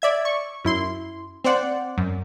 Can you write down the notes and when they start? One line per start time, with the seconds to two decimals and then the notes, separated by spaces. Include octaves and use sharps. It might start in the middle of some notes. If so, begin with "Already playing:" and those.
0.02 D5 E5 G#6
0.25 C#6
0.64 F#2 E4 C6
1.44 C4 C5 D5 F#5
1.98 F#2